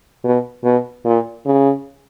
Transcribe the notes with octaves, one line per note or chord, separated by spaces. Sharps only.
B2
B2
A#2
C#3